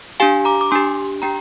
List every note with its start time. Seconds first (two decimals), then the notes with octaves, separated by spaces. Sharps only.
0.20 D4 G4 F5 G#5
0.45 A#5 D6
0.61 D6
0.71 D4 G4 G#5 C6
1.22 D4 G4 G5 A#5